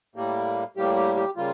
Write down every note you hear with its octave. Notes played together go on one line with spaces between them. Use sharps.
A2 G3 A#3
A2 G3 A#3 G4
G4
G4
C#3 G3 A#3 F4